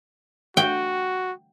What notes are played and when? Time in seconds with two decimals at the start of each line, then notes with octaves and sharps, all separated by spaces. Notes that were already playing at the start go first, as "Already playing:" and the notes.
0.57 F#4 G5